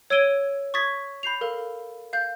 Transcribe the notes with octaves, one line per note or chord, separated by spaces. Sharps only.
C#5 E6 G#6 D7 D#7 G7
C#6 D#6 G#6 A6 B6
B5 G6 C7 F7
A4 A#4 F5
F5 G6